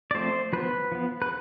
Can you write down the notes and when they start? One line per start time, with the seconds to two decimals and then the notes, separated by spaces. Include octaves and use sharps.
0.11 D5
0.14 F3 A3 C4 C5
0.53 F3 B3 B4
0.92 F3 B3
1.22 B4